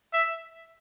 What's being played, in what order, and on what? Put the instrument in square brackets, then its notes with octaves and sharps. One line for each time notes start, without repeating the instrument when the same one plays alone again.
[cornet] E5